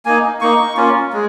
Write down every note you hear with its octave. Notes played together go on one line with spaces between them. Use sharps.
A#3 D#4 G#5
A#3 D#4 C#6
A#3 C#4 F4
G#3